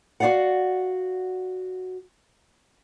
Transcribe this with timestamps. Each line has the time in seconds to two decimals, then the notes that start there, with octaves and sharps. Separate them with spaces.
0.20 F#4 G4 D5 F5 F#5